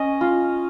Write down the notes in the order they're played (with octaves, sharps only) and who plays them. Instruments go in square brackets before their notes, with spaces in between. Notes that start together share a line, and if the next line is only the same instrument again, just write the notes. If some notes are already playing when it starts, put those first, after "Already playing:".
Already playing: [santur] C#4 D#5
F4